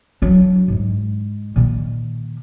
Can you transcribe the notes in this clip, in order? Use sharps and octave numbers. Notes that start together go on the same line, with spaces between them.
F#3 D4
G#2 G#3
A#2 D#3